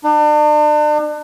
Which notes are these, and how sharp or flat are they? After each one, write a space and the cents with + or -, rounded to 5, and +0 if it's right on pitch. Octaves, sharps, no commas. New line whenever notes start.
D4 +40